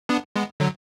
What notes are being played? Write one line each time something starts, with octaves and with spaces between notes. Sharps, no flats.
B3 D4
G#3 B3
D3 F#3